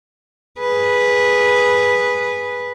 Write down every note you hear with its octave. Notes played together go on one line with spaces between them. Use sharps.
G#4 B4